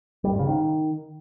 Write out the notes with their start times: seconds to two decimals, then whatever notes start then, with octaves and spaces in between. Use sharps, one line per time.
0.24 G3
0.32 G#2
0.39 C#3
0.47 D#3